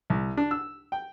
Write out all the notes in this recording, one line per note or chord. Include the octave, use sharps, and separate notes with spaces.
C2
D4
E6
G5